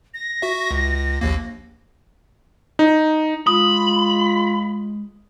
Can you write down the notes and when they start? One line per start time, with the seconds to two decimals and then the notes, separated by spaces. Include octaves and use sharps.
0.14 A#6
0.42 F#4 E5
0.71 C#2
1.21 A#1 D#2 A#3
2.79 D#4
3.47 G#3 F4 B5 D#6